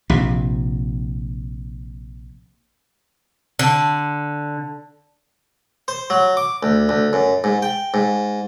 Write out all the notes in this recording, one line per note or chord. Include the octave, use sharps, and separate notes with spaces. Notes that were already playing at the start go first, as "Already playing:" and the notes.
A#1 C3
D3
C5
F#3
D6
D2
D2
F#2
G#2
G5
G#2